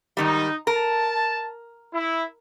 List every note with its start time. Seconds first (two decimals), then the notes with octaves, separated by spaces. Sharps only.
0.17 G#2 D#3 G3 D#4
0.67 A#4 A5
1.92 E4